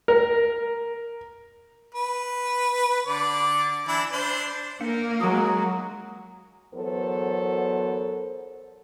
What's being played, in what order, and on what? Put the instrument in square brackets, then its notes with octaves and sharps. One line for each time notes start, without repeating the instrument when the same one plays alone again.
[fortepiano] A#4
[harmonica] B4
D3 D5
E3 D4 E4
D4 C5
[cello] A#3 A#4 [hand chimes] D4 F5 C#7
[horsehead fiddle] F#3 G#3 [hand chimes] A#5 D#6
[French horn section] E2 F#3 B3 A4 A#4 C5